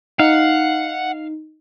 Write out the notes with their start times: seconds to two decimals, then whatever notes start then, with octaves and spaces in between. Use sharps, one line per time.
0.19 D#4 F5 F#5